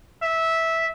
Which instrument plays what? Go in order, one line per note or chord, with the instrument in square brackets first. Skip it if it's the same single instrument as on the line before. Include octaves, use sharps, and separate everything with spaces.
[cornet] E5